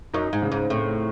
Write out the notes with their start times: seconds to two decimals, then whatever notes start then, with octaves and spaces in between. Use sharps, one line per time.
0.14 F#2 D#4
0.33 G#2
0.42 C#3
0.52 G#2
0.70 A2 C4